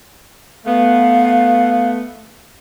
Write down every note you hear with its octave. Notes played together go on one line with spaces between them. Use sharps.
A3 B3 F5